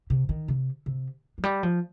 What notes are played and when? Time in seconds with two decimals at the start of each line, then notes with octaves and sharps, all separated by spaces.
0.10 C3
0.29 D#3
0.48 C3
0.86 C3
1.38 F3
1.43 G3
1.63 F3